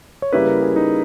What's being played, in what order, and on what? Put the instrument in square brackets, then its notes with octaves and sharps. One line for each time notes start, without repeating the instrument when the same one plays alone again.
[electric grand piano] C#5
[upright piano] C#3 G3 A#3 E4 G4 [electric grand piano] B4
[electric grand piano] A#4
G#4
D#4